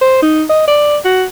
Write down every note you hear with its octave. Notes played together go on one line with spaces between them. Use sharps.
C5
D#4
D#5
D5
F#4